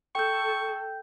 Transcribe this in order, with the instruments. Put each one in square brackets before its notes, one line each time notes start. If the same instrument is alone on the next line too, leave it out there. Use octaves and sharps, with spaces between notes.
[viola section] A4 [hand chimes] G5 G6 [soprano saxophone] C#6